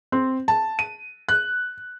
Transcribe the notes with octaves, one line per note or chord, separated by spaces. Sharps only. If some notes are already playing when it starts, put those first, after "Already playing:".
C4
A5
D#7
F#6